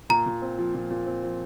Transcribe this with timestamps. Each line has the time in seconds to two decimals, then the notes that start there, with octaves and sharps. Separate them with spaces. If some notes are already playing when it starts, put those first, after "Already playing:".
0.10 A#2 A#5
0.26 A#2
0.42 C4
0.58 F3
0.74 A#2
0.91 A#2
1.07 C4
1.23 F3